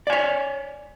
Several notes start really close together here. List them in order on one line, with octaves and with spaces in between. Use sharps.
D5 G#5 C#5